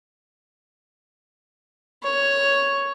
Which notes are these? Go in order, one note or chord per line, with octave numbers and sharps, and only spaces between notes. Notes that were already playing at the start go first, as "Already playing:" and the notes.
C#5